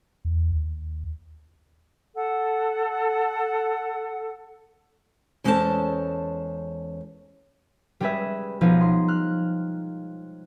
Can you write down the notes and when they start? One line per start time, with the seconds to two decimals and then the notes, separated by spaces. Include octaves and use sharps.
0.25 E2
0.52 D#2
2.15 A4 F#5
5.44 E2 G#3 C#4 A4 C5 A5
8.00 G3 G#3 C#4 G#4 B4 E5
8.61 B1 F3 B3 D#4 G#4
8.81 C6
9.08 F6 F#6